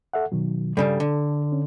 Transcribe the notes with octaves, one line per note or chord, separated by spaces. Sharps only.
A4 E5 F#5
B2 D#3 F#3
G2 C#3 G3 A4
D3
C#4